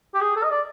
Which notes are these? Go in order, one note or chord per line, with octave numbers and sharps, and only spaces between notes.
G4
G#4
A4
D#5
D5